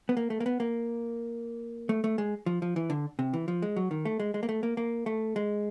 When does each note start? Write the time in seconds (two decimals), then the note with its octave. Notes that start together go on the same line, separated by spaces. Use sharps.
0.09 B3
0.17 A#3
0.30 A3
0.40 A#3
0.46 B3
0.60 A#3
1.89 A3
2.04 A3
2.18 G#3
2.46 F3
2.62 F3
2.76 E3
2.90 D3
3.19 C3
3.34 E3
3.48 F3
3.62 G#3
3.76 F#3
3.91 D#3
4.05 A3
4.20 G#3
4.34 G#3
4.43 A#3
4.49 A3
4.63 A#3
4.77 A#3
5.06 A3
5.36 G#3